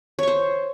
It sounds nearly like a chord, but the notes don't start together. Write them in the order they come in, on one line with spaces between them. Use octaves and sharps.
C#5 C#6 C5